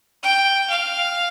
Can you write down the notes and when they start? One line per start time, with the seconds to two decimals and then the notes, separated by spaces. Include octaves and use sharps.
0.23 G5
0.70 F5